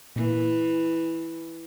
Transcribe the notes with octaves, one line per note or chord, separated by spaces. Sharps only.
A#2 E3 A#3